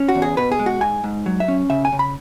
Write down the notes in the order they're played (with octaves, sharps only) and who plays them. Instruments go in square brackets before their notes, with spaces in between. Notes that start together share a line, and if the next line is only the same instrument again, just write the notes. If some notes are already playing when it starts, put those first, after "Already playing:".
Already playing: [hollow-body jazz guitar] C#4
F#4
E2
G#4
B2 B4
G#4
G#3
F#4
G#2 G#5
G#2
F#3
E5
C#4
C#3 E5
G#5
C#3
B5